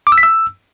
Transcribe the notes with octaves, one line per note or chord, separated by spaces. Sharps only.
D6
E6
B6
E6